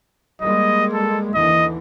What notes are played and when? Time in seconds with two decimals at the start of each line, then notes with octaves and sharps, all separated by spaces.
0.41 G3 G#3 A#3 D#5
0.93 A4
1.34 D#2 D3 E3 D#5